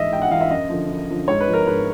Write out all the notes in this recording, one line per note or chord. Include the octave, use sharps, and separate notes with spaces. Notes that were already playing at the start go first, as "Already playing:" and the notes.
Already playing: G#2 E3 D#5 E5
G#2 G5
F#5
E3 F5
E5
F#2 D#5
D3 F3
F#2
D3 F3
G#2 C#5
B4
F3
A#4
G#2 B4